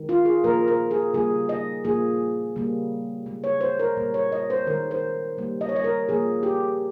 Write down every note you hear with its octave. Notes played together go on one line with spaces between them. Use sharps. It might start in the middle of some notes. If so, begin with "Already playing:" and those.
Already playing: D#3 G#3
F4
G#4
A#2 F3 A#3 A#4
A#4
G#4
C#3 G3 A#3 G#4
D#5
A#2 F3 A#3 G#4
C#3 G3 A#3
C#3 G#3
C#5
C5
A#4
A#2 G3 A#3
C#5
D#5
C5
D#3 G#3 A#4
C5
C#3 G3 A#3
D#5
C#5
D#5
A#4
A#2 F3 A#3 G#4
G4